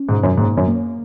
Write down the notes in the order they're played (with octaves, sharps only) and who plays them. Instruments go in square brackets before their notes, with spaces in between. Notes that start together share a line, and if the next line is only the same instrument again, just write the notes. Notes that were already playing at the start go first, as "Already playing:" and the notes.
Already playing: [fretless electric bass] C#4
[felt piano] G#2 [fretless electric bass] B2
[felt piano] F#2
[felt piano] G#2 [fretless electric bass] A#3
[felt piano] F#2
[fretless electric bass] A#3